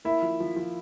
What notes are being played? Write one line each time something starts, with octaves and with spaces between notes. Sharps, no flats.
A#3 E4 E5
F3
F3
F3